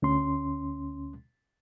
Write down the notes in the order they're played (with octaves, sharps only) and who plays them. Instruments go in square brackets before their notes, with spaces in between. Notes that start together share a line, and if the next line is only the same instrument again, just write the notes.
[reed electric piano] D2 C#4 C6